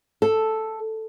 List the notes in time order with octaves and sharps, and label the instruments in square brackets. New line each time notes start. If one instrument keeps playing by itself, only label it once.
[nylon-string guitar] A4